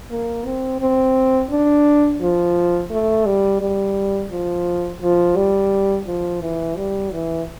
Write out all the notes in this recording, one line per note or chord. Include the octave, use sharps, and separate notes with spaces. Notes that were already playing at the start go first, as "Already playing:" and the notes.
A#3
C4
C4
D4
F3
A3
G3
G3
F3
F3
G3
F3
E3
G3
E3